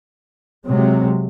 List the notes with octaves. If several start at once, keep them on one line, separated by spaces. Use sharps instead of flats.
C3 F#3 G#3